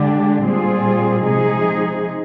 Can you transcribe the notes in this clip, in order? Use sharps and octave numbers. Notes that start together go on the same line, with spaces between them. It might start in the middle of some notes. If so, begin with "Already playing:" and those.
Already playing: D3 G#3 D4 G4
A#2 G3 C4 F4 G#4
C3 F3 G#3 D#4 G#4